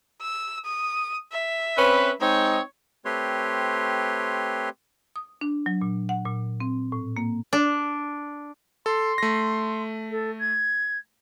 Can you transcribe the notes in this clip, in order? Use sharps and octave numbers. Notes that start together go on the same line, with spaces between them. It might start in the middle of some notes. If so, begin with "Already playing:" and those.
E6
D#6
E5
C4 C#4 B4
G#3 C4 D#4 C#5
A3 C4 G4 B4 C#5 C6
D#6
D4
F#3
A#2
F#5
A#2
C4
A2
A#3
D4
A4 C6
A3 A#6
A4
G#6